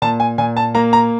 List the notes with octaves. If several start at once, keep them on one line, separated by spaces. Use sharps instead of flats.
A#2 A5
G#5
A#2 G#5
A5
A#3 A#5
A#5